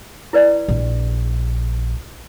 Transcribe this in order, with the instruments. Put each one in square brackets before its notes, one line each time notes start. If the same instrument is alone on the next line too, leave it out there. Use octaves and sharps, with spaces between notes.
[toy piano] E4 B4 D5
[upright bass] A#1